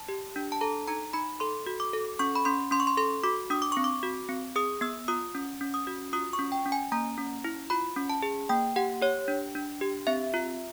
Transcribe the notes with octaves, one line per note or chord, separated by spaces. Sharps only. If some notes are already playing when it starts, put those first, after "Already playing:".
Already playing: A5
G4
D4
A5
A4 A#5
D#4 A#5
D#4 B5
A4 C6
F#4
D6
A4
C#4 C#6
B5
C#4 C6
C#4 C6
C#6
C6
A4 C6
F#4 D6
D4 D#6
D6
C4 C#6
D6
F#4
C4
G#4 D#6
B3 E6
F4 D#6
C#4
C#4
D#6
F#4
F4 D#6
C#6
C#4
G5
C#4
G#5
A#3 A#5
C#4
E4
F4 B5
C#4
A5
G#4
A#3 G5
G4 F#5
G4 C#5
D4
D4
G4
C4 E5
F4